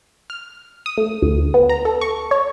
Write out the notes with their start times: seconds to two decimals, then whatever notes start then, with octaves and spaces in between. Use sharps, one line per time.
0.30 F6
0.86 D#6
0.98 A3
1.22 D2
1.54 B3
1.69 A#5
1.85 A4
2.01 C#6
2.31 C#5